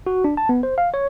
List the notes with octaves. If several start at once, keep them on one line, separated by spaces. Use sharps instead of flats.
F#4
D4
A5
B3
C5
F5
C#5